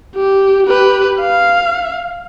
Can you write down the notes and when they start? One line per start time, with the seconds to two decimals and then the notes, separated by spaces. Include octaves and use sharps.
0.15 G4
0.67 G4 B4
1.20 F5